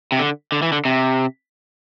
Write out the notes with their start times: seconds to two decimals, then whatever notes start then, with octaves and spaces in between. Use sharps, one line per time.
0.12 C3
0.19 D3
0.52 D3
0.62 E3
0.72 D3
0.85 C3